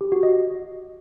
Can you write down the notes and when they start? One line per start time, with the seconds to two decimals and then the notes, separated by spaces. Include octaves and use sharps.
0.01 G4
0.12 F#4
0.23 D#5